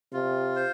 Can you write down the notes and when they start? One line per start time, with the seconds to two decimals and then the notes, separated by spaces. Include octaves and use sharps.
0.13 C3 F4
0.56 C5